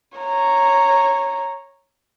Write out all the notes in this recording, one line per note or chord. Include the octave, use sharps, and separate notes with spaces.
C#5 A#5